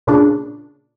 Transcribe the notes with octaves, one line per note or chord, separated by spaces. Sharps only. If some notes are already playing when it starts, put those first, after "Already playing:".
A#2 C#3 D4